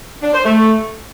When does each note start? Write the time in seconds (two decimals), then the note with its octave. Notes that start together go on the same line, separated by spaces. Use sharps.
0.22 D4
0.33 C5
0.45 A3